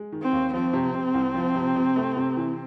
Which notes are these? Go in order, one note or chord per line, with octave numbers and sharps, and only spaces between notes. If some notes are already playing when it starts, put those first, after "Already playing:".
Already playing: G#3
D#3
C4
D#2
F3 C4
C3
C3
C2
F3
C3
C3
A3
C3
E3